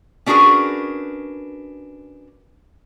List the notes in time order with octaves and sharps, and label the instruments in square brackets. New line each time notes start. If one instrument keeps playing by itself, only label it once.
[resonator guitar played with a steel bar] C#4 D4 F#4 G#4 A#4 B4